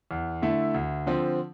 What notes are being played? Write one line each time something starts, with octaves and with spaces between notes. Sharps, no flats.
E2
D3 A3 E4 A4
D2
D3 F3 C4